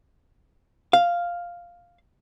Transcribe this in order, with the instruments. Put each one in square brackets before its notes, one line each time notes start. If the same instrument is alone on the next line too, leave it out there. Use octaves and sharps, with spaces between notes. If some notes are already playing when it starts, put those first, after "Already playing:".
[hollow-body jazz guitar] F5